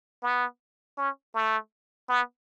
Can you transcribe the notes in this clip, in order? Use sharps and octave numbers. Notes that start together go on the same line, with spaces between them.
B3
C#4
A3
B3